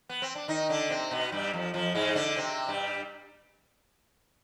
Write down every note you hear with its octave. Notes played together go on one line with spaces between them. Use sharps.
B3
C4
D4
D#3 D#4
D3 D4
C3 C4
B2 B3
G2 G3
F2 F3
F2 F3
G#2 G#3
D3 D4
C3 C4
G2 G3